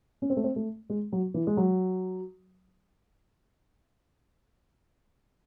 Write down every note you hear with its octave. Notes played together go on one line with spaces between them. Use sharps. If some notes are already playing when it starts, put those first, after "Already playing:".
C#4
C4
A3
C4
A3
G#3
F#3
E3
G#3
F#3